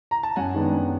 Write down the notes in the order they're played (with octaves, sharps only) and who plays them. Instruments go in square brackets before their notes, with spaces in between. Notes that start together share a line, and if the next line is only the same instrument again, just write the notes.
[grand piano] A#5
A5
F#2 F#5 G#5
D#3 G#3 B3 D4
F#2